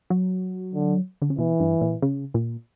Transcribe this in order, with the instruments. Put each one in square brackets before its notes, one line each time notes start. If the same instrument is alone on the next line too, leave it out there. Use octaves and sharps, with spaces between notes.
[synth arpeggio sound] F#3
[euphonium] D3
[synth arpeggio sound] D3
C#3
[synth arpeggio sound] B2 [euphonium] E3
[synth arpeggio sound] G2
A#2
C#3
A#2